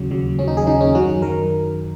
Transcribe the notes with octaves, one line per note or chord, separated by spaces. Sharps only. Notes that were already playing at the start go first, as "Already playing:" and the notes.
Already playing: D#2 C#3 F#3
D#2 C#3 F#3
D#2 C#3 F#3 C#4
D#4
G#4
D#2 C#3 F#3 D#4
C#4
F#2 D#3 F#3 F#4
D#3 F#3 A#4